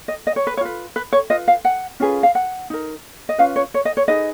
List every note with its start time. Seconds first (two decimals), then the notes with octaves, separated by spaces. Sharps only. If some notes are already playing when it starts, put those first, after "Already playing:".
0.08 D#5
0.27 D#5
0.36 C#5
0.47 B4
0.57 C#5
0.61 F4 B4
0.96 B4
1.13 C#5
1.30 F4 B4 D#5
1.48 F5
1.65 F#5
2.00 C#4 F4 G#4 B4
2.23 F5
2.35 F#5
2.70 D#4 A#4
3.29 D#5
3.38 C#4 F4 B4 F5
3.56 C#5
3.74 C#5
3.85 D#5
3.97 C#5
4.08 D#4 G#4 B4 D#5